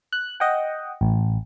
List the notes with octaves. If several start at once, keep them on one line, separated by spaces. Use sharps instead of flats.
F#6
D#5 F#5 G5
A1